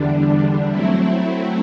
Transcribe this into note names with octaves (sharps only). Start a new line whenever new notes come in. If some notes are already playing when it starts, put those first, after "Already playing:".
Already playing: E2 D3 G3 D4
F#3 A3 C4 E4